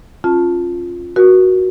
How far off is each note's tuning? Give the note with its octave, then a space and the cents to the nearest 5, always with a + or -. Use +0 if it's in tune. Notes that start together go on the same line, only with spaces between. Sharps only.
C#4 -35 F4 +0 A5 +0
F#4 +0 A#4 +40